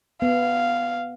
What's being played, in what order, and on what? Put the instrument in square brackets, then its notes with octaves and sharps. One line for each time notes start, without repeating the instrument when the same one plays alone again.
[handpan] B3 [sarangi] F5